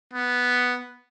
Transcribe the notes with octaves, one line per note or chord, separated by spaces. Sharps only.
B3